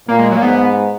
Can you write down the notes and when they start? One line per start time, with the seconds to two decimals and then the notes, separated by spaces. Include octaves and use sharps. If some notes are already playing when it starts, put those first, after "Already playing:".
0.08 A#2 A#3
0.19 G#3
0.31 F#3
0.37 A#3
0.42 G#2 B3